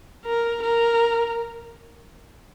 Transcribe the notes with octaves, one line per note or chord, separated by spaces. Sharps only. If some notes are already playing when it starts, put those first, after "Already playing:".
A#4
A#4